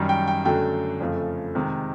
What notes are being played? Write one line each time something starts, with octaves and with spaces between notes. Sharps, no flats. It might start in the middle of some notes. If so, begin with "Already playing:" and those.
Already playing: F#2 D#3 G3
G5
G5
F#2 D3 F#3 A3 G5
F2 C#3 F3 A3
C3 D#3 G#3